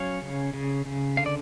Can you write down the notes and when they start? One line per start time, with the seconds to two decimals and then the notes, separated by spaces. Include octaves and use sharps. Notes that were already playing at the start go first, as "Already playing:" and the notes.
Already playing: F#3 C#4 C#5 F5
0.22 C#3
0.54 C#3
0.86 C#3
1.17 D3 F5
1.26 D5